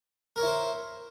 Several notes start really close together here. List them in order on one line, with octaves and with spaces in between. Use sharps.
A#4 C#5 E4 C5